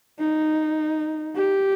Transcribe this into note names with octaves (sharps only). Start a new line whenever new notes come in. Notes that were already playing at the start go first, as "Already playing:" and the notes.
D#4
G4